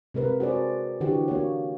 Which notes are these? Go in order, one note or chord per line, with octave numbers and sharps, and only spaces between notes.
C3 G#3 A#4 B4
F#4 G#4 C5 D5
D3 E3 F#4 G4
A#3 F#4 C#5